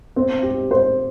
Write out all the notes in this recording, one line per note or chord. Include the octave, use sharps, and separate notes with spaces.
C4
G4
C5